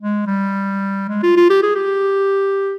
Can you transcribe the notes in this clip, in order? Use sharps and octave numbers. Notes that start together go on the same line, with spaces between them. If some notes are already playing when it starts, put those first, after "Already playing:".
G#3
G3
G#3
F4
F4
G4
G#4
G4